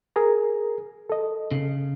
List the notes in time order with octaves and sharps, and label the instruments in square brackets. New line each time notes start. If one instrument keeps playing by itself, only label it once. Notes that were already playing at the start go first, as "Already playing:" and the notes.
[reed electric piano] G#4 A#4 A#5
A4 D#5
[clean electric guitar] C#3